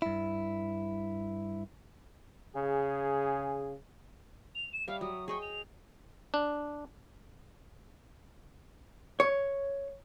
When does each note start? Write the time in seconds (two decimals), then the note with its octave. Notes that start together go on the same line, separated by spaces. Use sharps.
0.02 G2 E4
2.56 C#3 G#4
4.55 F7
4.73 E7
4.88 G3 C#5 E5 F5
5.01 F#3 D#6
5.28 G#4 D#5 G5 C#6
5.42 F7
6.34 D4
9.20 C#5